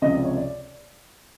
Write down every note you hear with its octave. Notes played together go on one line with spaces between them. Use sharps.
C#2 C3 F3 D#5
D5
C#5
D5